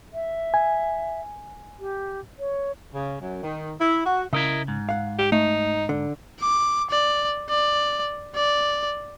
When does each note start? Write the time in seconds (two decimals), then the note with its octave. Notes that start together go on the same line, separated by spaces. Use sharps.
0.14 E5
0.54 G#5
1.80 G4
2.39 C#5
2.94 C#3
3.21 F#2
3.43 D#3
3.80 E4
4.06 F#4
4.33 C#3 E4 A#4 D#5
4.68 G#2
4.89 F5 F#5
5.19 G4
5.32 A3 D#4
5.89 D3
6.40 D6
6.90 D5
7.49 D5
8.35 D5